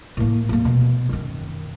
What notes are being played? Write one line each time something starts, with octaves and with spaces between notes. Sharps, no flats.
A2 A#3
D#1 A#3
B2
F#2 D#3